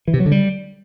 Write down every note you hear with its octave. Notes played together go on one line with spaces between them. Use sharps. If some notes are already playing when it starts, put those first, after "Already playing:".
E3
C3
F#3
D3
G3